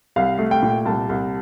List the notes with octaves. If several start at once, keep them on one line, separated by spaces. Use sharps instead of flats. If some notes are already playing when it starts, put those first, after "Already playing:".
C2 F5
A3
G5
A#2
C2 A5
C2